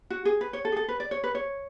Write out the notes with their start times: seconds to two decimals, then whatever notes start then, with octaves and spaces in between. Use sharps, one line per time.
0.10 F#4
0.25 G#4
0.41 B4
0.53 C#5
0.65 A4
0.72 G#4
0.77 A4
0.89 B4
1.00 D5
1.11 C#5
1.24 B4
1.35 C#5